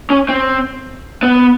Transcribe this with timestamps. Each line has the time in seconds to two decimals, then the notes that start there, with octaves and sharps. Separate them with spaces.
0.10 C#4
0.29 C4
1.23 B3